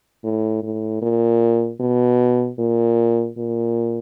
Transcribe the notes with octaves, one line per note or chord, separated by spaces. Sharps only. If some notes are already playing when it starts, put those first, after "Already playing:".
A2
A2
A#2
B2
A#2
A#2